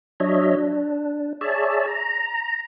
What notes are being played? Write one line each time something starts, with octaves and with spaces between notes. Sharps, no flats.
F#3 D4 C#5 D#5 E5
D4
G#4 C#5 D5 E5 A5
A#5